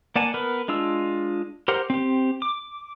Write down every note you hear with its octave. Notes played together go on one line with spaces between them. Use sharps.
A#3 D5 F#5 G#5 A5
B3 A#4 B4
G#3 D4 F4 E6
G4 A#4 C5 F#5
C4 G4
D6